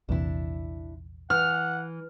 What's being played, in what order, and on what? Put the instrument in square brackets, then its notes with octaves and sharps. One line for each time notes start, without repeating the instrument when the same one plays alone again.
[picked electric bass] A#1 E2 C3 [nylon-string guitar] D4 E4
[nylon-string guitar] E3 [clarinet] F#5 [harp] F6